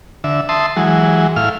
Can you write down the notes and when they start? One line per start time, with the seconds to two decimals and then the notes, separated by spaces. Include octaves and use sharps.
0.24 D3 E5
0.49 E5 A5 C6 D#6
0.77 E3 F#3 G#3
1.36 A2 E4 F5 F6